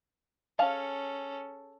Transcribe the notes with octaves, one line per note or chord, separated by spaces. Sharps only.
C#4 G#4 A4 F5 A5